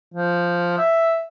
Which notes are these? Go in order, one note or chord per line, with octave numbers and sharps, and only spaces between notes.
F3
E5